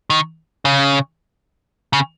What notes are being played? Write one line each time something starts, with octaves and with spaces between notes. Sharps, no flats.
D#3
C#3
C#3